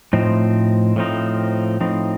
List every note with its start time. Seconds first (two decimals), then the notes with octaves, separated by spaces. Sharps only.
0.13 A2 F3 C4 D#4
0.96 A2 F3 C4 D#4
1.80 A2 F3 C4 D#4